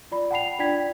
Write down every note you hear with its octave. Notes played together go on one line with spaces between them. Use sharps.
F4 D5 B5
F#5 G5 A5 B5 C7 F7
D4 F4 D5 G5 G#6 B6